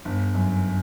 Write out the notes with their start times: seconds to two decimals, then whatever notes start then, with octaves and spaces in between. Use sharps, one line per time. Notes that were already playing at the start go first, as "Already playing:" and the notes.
0.05 G1
0.34 F#2